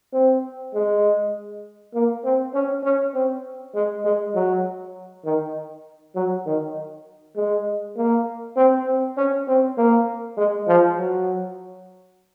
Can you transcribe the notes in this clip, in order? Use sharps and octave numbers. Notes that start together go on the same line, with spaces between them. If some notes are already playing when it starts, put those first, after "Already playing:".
C4
G#3
A#3
C4
C#4
C#4
C4
G#3
G#3
F#3
D#3
F#3
D#3
G#3
A#3
C4
C4
C#4
C4
A#3
G#3
F3
F#3